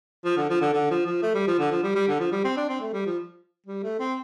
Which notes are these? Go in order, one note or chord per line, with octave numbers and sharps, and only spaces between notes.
F3
D3
F3
D3
D3
F3
F3
A3
G3
F3
D3
F3
G3
G3
D3
F3
G3
C4
D4
C4
A3
G3
F3
G3
A3
C4